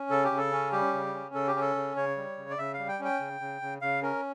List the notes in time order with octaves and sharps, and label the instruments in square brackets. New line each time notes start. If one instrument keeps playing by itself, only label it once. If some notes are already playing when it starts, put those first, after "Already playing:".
Already playing: [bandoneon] C#4
C#3 A4
G4
C#3
A4
C#4
G3 G4
C#3
C#4
C#3 A4
G4
C#4
A4
C#3
C#3 C#5
G3
C#3
D5
C#3 E5
F5
G3
G5
C#4
G5
C#3
C#3
C#3
C#3 F5
C#4 A#4